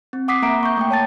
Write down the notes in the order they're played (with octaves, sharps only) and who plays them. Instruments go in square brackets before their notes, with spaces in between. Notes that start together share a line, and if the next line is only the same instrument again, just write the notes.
[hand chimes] C4
F#5 D6 D#6 B6 C7
A#3 E5 F#5 A#5 D7
C#6 G6
A3 A#3 G5
C#5 A5 A6